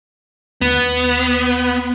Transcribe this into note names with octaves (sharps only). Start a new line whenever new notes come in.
D#2 B3